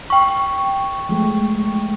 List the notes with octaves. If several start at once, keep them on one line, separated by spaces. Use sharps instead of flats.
G5 C#6
F3 G#3 A3